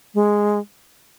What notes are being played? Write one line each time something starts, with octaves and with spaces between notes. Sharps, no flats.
G#3